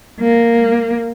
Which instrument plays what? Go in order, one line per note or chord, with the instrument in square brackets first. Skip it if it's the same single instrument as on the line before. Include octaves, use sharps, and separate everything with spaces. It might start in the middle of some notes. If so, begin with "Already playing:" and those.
[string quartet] A#3